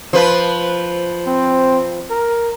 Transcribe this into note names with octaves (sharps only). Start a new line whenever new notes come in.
F3 B4
C4
A#4